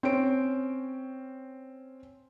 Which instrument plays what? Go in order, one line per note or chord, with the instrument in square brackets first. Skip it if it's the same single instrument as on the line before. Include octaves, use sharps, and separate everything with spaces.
[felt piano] C4 C#4 D7